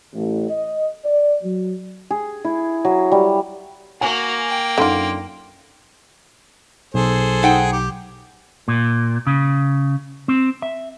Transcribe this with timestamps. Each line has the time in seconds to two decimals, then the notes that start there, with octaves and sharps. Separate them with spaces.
0.14 A1
0.50 D#5
1.05 D5
1.43 F#3
2.11 G#4
2.45 E4
2.85 F#3
3.12 G3
4.01 A#3 F#4 G#5
4.48 G5
4.78 F#2 D3 D#4 F4 C6
6.94 B1 G#4 A4 C5
7.43 D#4 F#5 G5
7.72 G4
8.68 A#2
9.27 C#3
10.28 C4
10.62 E5